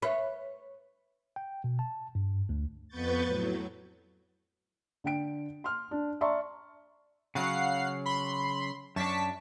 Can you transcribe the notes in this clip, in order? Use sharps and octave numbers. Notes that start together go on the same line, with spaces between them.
B4 C#5 E5 B5
G5
B2
A5
G2
D2
F2 B3 B4 C#6 G6 A6
A2 F#3
D3 G5 D7
C6 F6
D4
D5 E5 A5 A#5 C6 C#6
C#3 F#3 F5 F#5 C7
B5 C6
F#2 D4 A5 C#6 B6